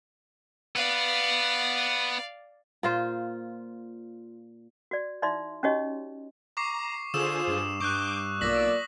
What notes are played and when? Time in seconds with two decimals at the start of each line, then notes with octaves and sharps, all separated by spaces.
0.76 B3 B4 D5 F5
2.83 A#2 F4 C5
4.91 F#4 D5
5.22 D#4 E4 D5 E5 C6
5.63 C#4 D#4 F#4 G4 C#5 D#5
6.57 A#5 C#6 D6 C7
7.14 D3 F4 G#4 C5 D#6 E6 E7
7.48 G2
7.80 G2 C#6 D6 F#6 G6
8.41 B1 A#3 F4 D5 E6 A#6 B6 F#7